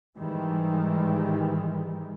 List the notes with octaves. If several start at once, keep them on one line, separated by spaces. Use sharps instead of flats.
G#2 D#3 E3 G3 G#3